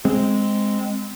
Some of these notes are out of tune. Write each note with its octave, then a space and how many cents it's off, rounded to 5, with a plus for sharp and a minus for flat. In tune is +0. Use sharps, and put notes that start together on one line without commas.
G#3 +0 C4 +0